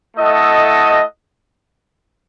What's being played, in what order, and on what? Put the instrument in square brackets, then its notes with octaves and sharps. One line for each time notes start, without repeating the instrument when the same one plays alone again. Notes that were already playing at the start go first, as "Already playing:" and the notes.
[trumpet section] A3 E4 A4 D#5 F#5